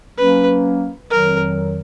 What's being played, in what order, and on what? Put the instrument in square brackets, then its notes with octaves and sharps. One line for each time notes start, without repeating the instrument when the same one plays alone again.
[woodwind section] F#3 A#3 C#4 [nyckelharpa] B4
[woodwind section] F2 D#3 F#3 [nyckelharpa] A#4